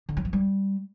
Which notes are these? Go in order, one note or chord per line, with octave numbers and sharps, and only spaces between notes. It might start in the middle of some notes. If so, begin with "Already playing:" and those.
D3
F#3
F3
G3